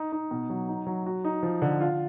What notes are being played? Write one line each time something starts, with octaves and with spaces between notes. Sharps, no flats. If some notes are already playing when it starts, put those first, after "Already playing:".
Already playing: D#4
D#4
B2
F#3
D#4
F#3
F#4
D#4
F3
D3
F4